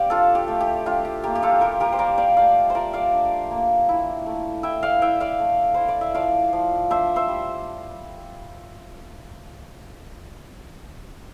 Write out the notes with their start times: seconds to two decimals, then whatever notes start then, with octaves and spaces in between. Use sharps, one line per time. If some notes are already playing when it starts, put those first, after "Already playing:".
Already playing: C4 G4 D5 F5
0.10 D4 F4 A4
0.35 G4
0.48 A3
0.61 G4
0.86 D4 F4
1.05 G4
1.24 A#3 G4
1.35 G4
1.43 F4 A4
1.61 G3 G4 A#4
1.80 G4 A#4
1.93 C5
1.99 G3 A#4 D5
2.18 D5 F5
2.37 A3 D5 F5
2.70 C5
2.75 F4 A#4 D5
2.93 D5 F5
3.13 D4
3.51 A#3
3.89 E4
4.26 A3
4.63 E4 E5 G5
4.83 D5 F5
5.01 E4 E5 G5
5.20 D5 F5
5.40 A3
5.74 E4 C5
5.88 D5
6.01 E5
6.14 F3 D5 F5
6.53 F3
6.91 D4 C5 E5
7.16 C5 E5
7.28 G3